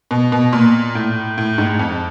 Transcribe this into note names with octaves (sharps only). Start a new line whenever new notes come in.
B2
B2
A#2
A2
A2
G#2
F2